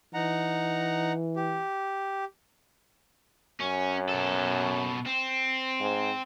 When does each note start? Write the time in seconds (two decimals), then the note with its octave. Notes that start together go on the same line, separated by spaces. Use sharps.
0.14 E3 D#4 F#5 A#5
1.36 G4
3.61 F#2 C#4
4.09 B2 A4
5.06 C4
5.80 G#2